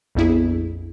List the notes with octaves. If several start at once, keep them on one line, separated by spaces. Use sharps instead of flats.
A#1 F2 B3 E4 G#4